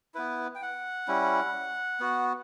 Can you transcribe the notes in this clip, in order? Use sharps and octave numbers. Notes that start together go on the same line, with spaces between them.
B3 E4 B4
G5
F#5
G3 C#4 E4
B3 F#4